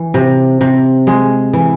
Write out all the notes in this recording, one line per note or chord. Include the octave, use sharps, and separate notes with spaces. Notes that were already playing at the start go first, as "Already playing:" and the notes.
Already playing: E3
C3
C3
G#3 G#4
E3